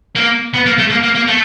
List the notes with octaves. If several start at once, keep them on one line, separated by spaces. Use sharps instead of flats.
A#3
B3
A#3
A3
A#3
A#3
A#3
A3